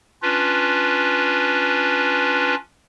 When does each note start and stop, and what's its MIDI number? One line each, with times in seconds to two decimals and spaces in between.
0.22 2.55 61
0.22 2.55 62
0.22 2.55 65
0.22 2.55 71